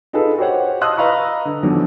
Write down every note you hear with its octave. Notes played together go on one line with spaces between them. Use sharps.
D#4 F4 G#4 A4 B4
F#4 G4 C5 C#5 F#5
D#5 A5 C6 D#6 E6 F#6
B4 D#5 F5 A#5 B5 C#6
D3
E2 D3 D#3 F3 F#3